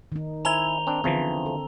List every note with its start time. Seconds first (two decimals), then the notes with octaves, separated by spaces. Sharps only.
0.12 D#3 D#4
0.45 E4 C5 G#5 A#5 F7 G7
0.87 C4 D4
1.04 E2 D3 E3 F3 C4
1.46 A4